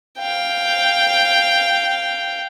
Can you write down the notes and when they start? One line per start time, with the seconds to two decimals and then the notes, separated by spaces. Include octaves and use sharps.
0.19 F5 G5